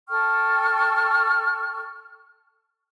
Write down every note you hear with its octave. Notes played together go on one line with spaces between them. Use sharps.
A4 G5 C#6 F6